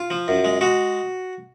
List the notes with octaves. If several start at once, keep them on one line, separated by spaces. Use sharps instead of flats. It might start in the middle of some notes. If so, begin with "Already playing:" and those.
Already playing: F4
F3
F#2
G#3
G#3 F#4